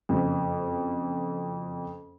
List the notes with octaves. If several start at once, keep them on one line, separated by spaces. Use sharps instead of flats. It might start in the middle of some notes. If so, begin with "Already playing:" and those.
F#1 F2